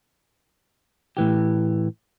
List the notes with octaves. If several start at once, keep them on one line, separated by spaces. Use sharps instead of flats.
A2 E3 G4